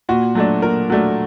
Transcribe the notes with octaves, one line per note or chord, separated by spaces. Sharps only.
A#2 F#4
F#3 A3 D4
A#2 A#4
F#3 A3 D4